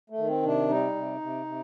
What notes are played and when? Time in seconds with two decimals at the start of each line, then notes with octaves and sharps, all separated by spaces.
0.10 A3
0.17 D#3
0.27 C4
0.43 C3 D4
0.69 G3 D#4
0.95 C3
1.21 C3
1.46 C3